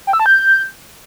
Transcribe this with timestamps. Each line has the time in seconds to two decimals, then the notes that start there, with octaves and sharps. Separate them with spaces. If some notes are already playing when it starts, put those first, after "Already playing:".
0.07 G5
0.13 E6
0.20 A5
0.26 G6